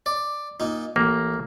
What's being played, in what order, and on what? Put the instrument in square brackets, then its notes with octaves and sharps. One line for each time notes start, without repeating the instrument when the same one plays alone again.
[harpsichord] D5
A#2 D#4
[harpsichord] A1 [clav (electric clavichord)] A#3